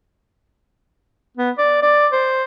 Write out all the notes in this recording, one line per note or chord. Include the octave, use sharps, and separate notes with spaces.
B3
D5
D5
C5